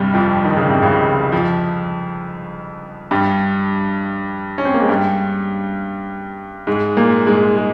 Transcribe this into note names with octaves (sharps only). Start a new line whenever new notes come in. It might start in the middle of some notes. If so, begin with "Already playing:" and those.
Already playing: C2 G2 C3 G3
F2 F3
D#3
C#3
C3
C#2 C#3
F2 F3
G2 G3
C#4
C4
A#3
G#3
G2 G3
G#2 G#3
A#2 A#3
G#2 G#3
G#3